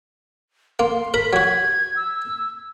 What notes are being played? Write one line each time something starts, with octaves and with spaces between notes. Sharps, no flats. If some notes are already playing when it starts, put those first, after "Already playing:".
A#3 C6
A#4 B5 B6
F#3 F#4 G#6
E6